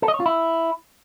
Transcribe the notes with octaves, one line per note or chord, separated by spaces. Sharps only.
A4
D#5
C#5
F4
E4